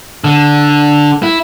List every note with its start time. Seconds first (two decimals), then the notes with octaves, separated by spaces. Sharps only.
0.24 D3
1.23 E4